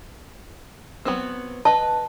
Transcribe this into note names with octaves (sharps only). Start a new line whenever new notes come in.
F#3 B3 C4
B4 D#5 A5